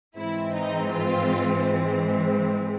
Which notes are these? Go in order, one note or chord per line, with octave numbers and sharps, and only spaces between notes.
G#2 E3 G#3 C4 E4
D#4
F4